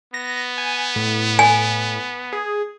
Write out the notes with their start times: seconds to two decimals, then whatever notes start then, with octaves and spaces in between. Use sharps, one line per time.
0.14 B3 A#6
0.58 G#5
0.96 A2
1.39 G#5
2.33 G#4